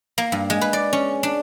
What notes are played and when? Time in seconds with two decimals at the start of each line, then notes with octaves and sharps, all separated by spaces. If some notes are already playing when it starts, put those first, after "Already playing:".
0.18 A#3
0.32 G2
0.50 G#3
0.61 B4
0.73 D5
0.93 C#4
1.23 D4